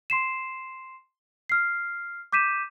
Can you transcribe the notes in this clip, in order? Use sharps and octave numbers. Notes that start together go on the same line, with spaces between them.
C6 C7 E7
F6 C7
D6 G6 B6 D#7 E7